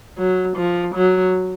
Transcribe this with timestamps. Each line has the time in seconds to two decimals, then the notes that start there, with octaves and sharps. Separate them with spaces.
0.18 F#3
0.56 F3
0.95 F#3